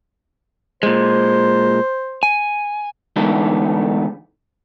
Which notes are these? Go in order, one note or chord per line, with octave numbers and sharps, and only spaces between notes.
A#2 G#3 C5
G#5
D3 E3 G#3 A3 B3 D#4